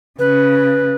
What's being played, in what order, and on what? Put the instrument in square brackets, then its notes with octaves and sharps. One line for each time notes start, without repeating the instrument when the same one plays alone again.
[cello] C#3 [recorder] B4